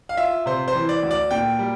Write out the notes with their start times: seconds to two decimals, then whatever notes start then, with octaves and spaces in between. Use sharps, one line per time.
0.09 F5
0.17 F4 E5
0.46 C3 C5
0.68 C5
0.75 E3
0.89 D5
1.02 D2
1.11 D5
1.31 A#2 G5
1.59 G3